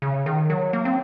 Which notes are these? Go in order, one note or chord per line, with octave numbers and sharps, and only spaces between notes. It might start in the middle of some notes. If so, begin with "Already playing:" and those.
C#3
D#3
F#3
A#3
C4